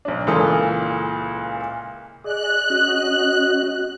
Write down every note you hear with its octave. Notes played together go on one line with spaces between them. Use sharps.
B1 D4
C#2 A#2 E3 A4 A#4 D#6
G#4 D5 D#5 F#6
C#4 F#4 D#5